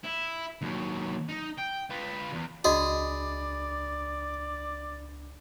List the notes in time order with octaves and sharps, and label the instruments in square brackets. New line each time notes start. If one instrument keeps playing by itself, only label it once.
[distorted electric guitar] E4
D#2 F#3
D#4
G5
F4 B4
E2
[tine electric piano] C#2 D4 B5 [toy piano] F#4 D#5 [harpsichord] G#4 [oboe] D5